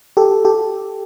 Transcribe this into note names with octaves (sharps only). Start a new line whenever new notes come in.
G4 A4
G4 A4